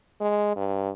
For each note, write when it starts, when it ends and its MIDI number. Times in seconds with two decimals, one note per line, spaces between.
0.21 0.51 56
0.56 0.90 43